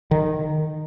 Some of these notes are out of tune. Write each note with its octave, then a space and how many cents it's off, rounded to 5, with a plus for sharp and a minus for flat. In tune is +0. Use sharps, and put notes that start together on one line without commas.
D#3 -15